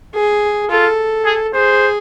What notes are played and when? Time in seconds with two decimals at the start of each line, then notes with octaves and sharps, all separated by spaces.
0.14 G#4
0.70 F4 A4
1.26 G#4
1.54 G#4 C5